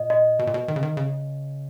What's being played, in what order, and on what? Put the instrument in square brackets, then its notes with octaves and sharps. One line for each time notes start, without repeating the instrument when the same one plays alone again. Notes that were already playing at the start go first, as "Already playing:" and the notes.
Already playing: [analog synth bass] A#2 [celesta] D#5
[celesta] D#5
[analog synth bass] B2
A#2
B2
D#3
C#3
D#3
C#3